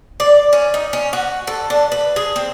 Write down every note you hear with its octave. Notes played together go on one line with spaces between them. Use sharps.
D5
C#4
D#4
C#4
F#4
A4
D4
B4
G#4
C4